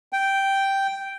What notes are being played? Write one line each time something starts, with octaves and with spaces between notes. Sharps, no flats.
G5